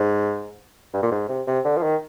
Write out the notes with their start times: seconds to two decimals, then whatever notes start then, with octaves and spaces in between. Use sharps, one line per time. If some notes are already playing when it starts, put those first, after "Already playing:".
Already playing: G#2
0.94 G2
1.03 A#2
1.11 G#2
1.29 C3
1.47 C3
1.65 D3
1.77 F3
1.83 D#3